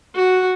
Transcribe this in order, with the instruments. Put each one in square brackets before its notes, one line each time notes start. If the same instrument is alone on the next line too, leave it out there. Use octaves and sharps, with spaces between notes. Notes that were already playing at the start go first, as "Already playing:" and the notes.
[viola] F#4